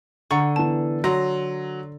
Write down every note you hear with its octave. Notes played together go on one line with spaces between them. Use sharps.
D3 F#5 A#5 C#6 A6
E3 B3 A5
F#3 A#5 C6